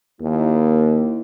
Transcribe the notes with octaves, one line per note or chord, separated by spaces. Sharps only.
D#2 A#3 E4